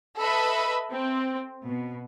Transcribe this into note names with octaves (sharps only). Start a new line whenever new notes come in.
A4 B4 D#5 E5 B5
C4
B2